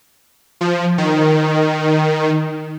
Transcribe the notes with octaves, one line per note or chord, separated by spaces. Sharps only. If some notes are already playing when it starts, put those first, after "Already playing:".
F3
D#3